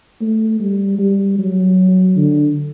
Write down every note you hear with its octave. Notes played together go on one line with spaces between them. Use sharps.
A3
G3
G3
F#3
D3